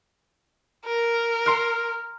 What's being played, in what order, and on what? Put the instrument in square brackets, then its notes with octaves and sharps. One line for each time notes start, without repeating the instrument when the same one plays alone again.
[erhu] A#4
[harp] A#5 C6 F6